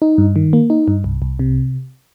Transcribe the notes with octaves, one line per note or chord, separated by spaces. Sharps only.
D#4
G2
D#3
A#3
D#4
G2
C2
C2
C3